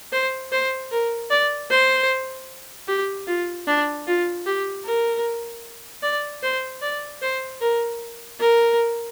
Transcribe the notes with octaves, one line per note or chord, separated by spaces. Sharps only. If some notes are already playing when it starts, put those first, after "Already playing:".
C5
C5
A#4
D5
C5
G4
F4
D4
F4
G4
A#4
D5
C5
D5
C5
A#4
A#4